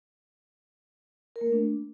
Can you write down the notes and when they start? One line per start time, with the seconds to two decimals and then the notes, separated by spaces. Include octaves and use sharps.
1.36 A#4
1.41 A#3
1.47 A3
1.52 D4